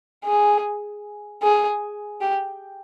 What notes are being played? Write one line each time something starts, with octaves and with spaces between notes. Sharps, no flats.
G#4
G#4
G4